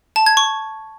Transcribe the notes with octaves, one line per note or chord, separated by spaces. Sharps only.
A5
G#6
C#6